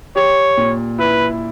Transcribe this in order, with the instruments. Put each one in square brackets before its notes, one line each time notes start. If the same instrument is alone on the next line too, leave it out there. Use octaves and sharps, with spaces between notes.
[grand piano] G4 [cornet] C#5
[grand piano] A#2
[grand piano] E4 [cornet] B4